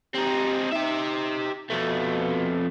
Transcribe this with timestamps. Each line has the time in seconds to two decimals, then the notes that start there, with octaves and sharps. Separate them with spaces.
0.14 C4 D#4 G4
0.72 D#4 G4 E5
1.70 F2 B2 A3